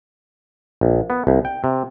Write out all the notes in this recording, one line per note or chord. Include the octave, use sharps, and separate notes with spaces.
A#1
B3
C2
G5
C3